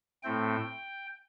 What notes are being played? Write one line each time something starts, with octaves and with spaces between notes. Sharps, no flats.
A2 A3 C4 G5